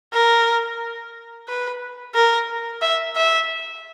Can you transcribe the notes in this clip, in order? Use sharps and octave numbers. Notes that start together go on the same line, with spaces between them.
A#4
B4
A#4
E5
E5